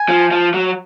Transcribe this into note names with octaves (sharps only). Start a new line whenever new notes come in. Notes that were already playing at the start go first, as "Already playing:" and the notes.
Already playing: G#5
F3
F3
F#3